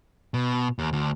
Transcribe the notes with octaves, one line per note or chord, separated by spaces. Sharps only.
B2
D#2
D2